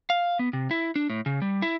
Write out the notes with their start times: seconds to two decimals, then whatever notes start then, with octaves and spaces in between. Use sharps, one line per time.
0.10 F5
0.39 B3
0.53 C3
0.71 E4
0.96 D4
1.10 A2
1.26 C#3
1.42 G3
1.62 E4